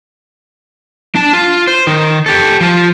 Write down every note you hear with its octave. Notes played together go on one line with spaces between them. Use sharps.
D4 A5
F4
C5
D#3 D#4
G4 A4
F3 F4